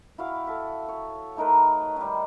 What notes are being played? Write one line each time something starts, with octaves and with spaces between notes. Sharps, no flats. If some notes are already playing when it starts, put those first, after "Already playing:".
E4 F#4 F5 G5
A4 E5
C#5
A3 D#4 A#4 B4
D#3 G3